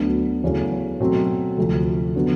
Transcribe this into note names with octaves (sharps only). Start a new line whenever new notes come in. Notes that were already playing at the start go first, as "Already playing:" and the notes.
Already playing: D2 D3 F#3 B3 D4
E2 C#3 F#3 A3 C#4
B2 F#3 A3 C4
D2 C3 F3 A3
D3 F#3 B3